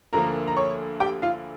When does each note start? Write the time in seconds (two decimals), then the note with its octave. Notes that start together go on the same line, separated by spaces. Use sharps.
0.13 D2 D3 F3 A#3 A#4 A#5
0.47 A#5
0.57 C#5 C#6
1.00 G4 G5
1.22 F4 F5